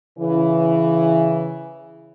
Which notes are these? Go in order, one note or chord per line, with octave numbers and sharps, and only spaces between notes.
C#3 E3